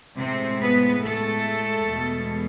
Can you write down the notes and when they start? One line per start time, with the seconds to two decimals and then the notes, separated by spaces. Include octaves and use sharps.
0.18 A2 C3 G#3 C4
0.61 B3 B4
1.03 A3 A4
1.88 E2 B2 G#3